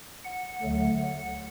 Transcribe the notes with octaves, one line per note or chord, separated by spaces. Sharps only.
F#5
D2 D3 F#3 A3